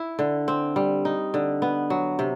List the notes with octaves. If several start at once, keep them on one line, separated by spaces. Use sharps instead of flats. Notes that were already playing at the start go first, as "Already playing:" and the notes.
Already playing: E4
D3
C4
G3
D#4
D3
B3
F#3
C3